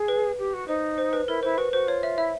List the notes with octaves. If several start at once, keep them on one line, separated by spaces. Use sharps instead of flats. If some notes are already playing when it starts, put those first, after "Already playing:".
Already playing: G#4
B4
G4
F#4
D#4 C5
C5
B4
E4 A#4
E4 C5
F#4 B4
F#4 C5
F4 C#5
E5
E4 E5